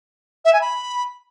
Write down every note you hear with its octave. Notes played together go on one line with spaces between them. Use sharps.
E5
G#5
B5